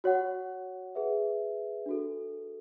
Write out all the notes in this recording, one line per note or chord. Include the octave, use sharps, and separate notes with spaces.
F#4 C#5 F#5
G#4 B4 E5
D4 F#4 A4